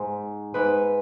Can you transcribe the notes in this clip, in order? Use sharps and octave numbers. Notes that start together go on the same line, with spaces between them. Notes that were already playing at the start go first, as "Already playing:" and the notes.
Already playing: G#2
G#2 B4